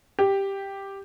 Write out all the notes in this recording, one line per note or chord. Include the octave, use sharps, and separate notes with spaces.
G4